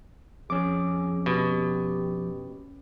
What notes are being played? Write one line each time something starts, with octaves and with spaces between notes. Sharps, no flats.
F2 C#4 G#4 D6
B2 G4